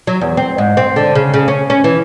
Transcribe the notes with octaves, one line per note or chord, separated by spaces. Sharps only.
F#3
E2
C4
G#2
C4
D3
C#3
C#3
C#4
C#4
E3